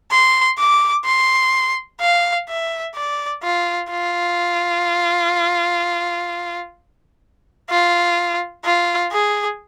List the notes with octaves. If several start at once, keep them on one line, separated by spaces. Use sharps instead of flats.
C6
D6
C6
F5
E5
D5
F4
F4
F4
F4
G#4